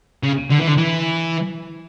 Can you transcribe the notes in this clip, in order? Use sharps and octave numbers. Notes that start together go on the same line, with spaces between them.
C#3
D3
E3
D3
E3